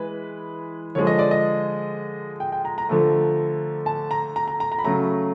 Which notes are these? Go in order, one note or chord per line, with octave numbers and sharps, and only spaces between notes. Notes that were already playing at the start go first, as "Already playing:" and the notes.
Already playing: E3 G#3 B4
D3 F3 G#3 C#5
D#5
D5
D#5
G5
G5
A#5
A#5
D3 F3 A3
A5
A#5
A#5
A#5
A#5
A#5
B5
C#3 F#3 A3 A#5